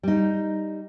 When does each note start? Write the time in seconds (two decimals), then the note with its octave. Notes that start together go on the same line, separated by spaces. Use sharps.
0.03 G3 D#4